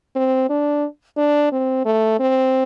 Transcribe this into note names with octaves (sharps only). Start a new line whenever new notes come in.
C4
D4
D4
C4
A3
C4